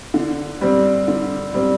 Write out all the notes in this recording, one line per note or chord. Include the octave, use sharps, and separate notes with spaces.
D3
G3 C4
D3
G3 C4